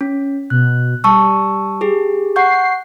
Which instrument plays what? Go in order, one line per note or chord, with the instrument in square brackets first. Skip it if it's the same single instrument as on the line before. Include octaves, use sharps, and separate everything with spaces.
[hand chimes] C#4
[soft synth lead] B2 [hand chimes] F#6
[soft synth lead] G3 [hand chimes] A5 C#6 E6
[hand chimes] G4 G#4
[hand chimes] F#5 C#6 G6 [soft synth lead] C7